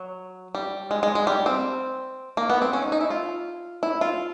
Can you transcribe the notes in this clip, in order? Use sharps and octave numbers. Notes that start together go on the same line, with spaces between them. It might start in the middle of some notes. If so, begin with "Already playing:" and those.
Already playing: F#3
G3
G#3
G#3
G#3
G3
C4
A#3
B3
C4
C#4
D#4
D#4
E4
F4
E4
F4